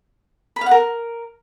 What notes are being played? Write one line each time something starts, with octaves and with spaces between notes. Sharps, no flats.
B5
F5
F#5
A#4